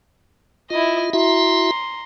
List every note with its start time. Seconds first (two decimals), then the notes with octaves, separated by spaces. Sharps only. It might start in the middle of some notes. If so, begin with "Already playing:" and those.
0.70 E4 F4 D#5
1.13 E4 F#4 E5 A#5 C6